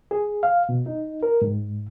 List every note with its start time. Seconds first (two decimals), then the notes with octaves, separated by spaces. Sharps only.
0.11 G#4
0.43 F5
0.69 B2
0.86 D#4
1.23 A#4
1.42 G#2